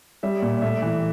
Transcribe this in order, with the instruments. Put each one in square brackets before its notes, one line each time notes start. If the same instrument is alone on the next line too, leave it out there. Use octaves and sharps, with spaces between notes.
[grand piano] G3 E5
A#2
A3 E5
E3